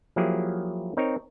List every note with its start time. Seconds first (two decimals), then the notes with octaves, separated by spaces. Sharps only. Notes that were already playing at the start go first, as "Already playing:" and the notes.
0.16 F3 F#3 A#3 E4 G4 G#4
0.97 C4 D#4 A#4 C#5